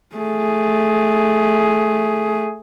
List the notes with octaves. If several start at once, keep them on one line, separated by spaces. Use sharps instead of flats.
A3 G#4